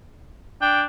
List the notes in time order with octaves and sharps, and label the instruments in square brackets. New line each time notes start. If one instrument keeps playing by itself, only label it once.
[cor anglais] D4 [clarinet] G5